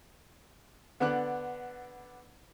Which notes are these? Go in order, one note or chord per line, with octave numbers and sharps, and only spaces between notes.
D3 B3 D4 D6 F#6